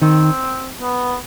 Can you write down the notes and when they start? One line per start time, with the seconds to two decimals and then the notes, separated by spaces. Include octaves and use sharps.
0.02 D#3 C4
0.80 B3